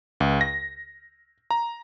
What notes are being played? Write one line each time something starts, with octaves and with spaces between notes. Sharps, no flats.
C#2
A#6
A#5